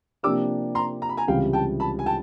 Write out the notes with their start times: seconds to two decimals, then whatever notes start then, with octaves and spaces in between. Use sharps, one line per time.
0.23 C3 F3 A#3 D4 G4 D6 E6
0.75 A#5 C6
1.02 A#5
1.09 B5
1.17 G#5 A#5
1.28 C#2 C3 E3 G3 F5 G5
1.53 G5 A5
1.80 A5 B5
1.99 G#5
2.06 G5 A5